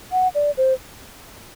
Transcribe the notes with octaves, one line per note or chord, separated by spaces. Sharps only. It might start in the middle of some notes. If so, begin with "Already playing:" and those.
F#5
D5
C5